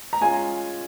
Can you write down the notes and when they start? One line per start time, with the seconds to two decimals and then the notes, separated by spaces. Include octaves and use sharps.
0.13 A#5
0.21 G#3 C#4 F4 G#5